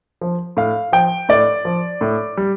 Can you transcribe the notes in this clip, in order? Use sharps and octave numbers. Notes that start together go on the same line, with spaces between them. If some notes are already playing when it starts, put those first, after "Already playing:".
F3
A2 F5
F3 G5
A2 D5
F3
A2
G3